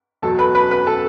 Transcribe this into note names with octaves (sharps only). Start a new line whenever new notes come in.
E2 B2 F#3 A4 A5
B4 B5
B4 B5
B4 B5
A4 A5